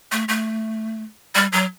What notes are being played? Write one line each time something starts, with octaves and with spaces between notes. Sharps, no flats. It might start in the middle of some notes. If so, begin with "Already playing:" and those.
A3
A3
G3
F#3